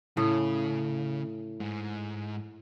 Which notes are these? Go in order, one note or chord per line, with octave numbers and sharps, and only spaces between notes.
A2 C#3
G#2